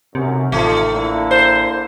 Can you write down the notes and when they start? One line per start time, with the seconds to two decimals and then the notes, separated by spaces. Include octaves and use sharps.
0.15 B1 F#2 C3
0.52 A1 D#3 F3 A3
0.92 D3 A#3 E4
1.31 C5